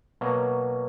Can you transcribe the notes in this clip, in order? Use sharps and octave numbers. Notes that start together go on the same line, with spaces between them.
B2 F#3 A#3